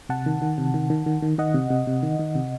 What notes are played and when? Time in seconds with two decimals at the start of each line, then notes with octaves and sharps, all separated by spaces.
0.09 C3 F#5 A5
0.26 D#3
0.42 D#3
0.58 C3
0.74 D#3
0.90 D#3
1.06 D#3
1.22 D#3
1.38 D#3 D#5 F#5
1.54 C3
1.70 C3
1.87 C3
2.03 D#3
2.19 D#3
2.35 C3